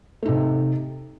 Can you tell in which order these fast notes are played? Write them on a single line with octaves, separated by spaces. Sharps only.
A3 D#4 C3